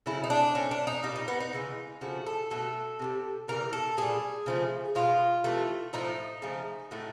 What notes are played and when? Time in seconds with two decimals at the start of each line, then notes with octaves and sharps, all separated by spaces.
0.06 C#3 F#3 A3 E4
0.24 D#4
0.30 D4
0.55 A2 F#3 A3 C#4
0.71 D4
0.87 D#4
1.03 A#2 G3 D#4
1.16 D#4
1.28 B3
1.40 D#4
1.53 C#3 E3 G#3
2.01 C#3 F3 A3 F#4
2.26 A4
2.50 B2 F#3 A3 A4
2.99 C3 D#3 G3
3.48 C#3 E3 G3 A#4
3.73 A4
3.97 A#2 G3 G#4
4.46 C#3 F3 A3
4.95 B2 G#3 F4
5.44 C3 E3 A3
5.93 A2 F3 A3 D#4
6.42 C#3 F3 A3
6.91 A2 F#3 A3